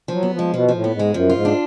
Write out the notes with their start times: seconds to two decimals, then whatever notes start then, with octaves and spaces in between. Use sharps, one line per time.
0.08 F3 F#3
0.23 B3
0.33 F3
0.39 G#3
0.53 B2 F3
0.68 F3
0.74 A2
0.84 B3
0.94 G#2
0.99 G#3
1.14 F#2 F3
1.29 F4
1.35 G#2
1.45 D4